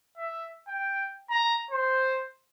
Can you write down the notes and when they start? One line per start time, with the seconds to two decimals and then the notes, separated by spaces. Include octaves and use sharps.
0.17 E5
0.68 G5
1.30 A#5
1.71 C5